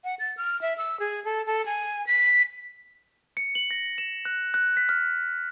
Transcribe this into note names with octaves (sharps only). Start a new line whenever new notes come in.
F#5
A6
F6
E5
E6
G#4
A4
A4
G#5
B6
C#7
F#7
A#6
E7
F#6
F#6
B6
F6